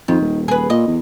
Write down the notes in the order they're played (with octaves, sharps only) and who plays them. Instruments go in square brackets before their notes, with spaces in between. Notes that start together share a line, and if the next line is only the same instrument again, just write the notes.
[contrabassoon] F2 [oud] D#3
[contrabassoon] D#1
[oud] G#4 B4
[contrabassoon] A#2 [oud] D#5
[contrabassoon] E2